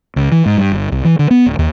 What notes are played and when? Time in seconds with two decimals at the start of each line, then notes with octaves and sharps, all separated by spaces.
0.16 C#2
0.32 E3
0.46 G#2
0.58 G2
0.72 G1
0.92 C2
1.05 E3
1.19 D3
1.31 B3
1.46 D1
1.59 D#2